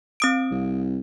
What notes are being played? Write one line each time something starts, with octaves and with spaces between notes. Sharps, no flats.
C4 D#6 D7
C2